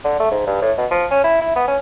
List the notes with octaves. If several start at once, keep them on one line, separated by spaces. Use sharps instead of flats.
D3
A3
G#2
G2
A2
B2
F3
C#4
E4
E4
B3
C#4